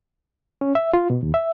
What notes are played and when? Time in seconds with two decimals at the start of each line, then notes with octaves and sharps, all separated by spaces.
0.61 C#4
0.75 E5
0.93 F4
1.10 B2
1.23 D#2
1.34 E5